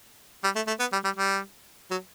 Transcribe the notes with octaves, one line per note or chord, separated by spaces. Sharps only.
G3
A3
A3
B3
G3
G3
G3
F#3